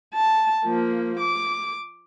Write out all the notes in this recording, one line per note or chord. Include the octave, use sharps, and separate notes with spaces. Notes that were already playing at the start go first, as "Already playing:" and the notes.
A5
F3 A#3
D6